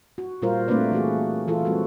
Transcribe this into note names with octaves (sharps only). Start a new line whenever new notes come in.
F#4
A#2 G3 F4 A#4 C5
A3 A#3 C4 D4 B4 D5
E3 A3 F#4 G#4
E3 E4 F4 A4
G3 G#3 C4 F#4